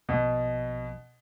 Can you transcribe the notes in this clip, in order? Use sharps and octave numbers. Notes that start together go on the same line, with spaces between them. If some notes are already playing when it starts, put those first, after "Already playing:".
A#1 B2